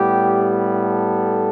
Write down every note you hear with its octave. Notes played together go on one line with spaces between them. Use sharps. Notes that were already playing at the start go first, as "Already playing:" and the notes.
Already playing: A2 G3 B3 G4
A4